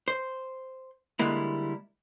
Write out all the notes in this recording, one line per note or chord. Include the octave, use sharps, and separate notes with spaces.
C5
D3 G3 G#3 A#3 E4